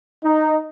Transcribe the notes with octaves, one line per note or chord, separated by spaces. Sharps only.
D#4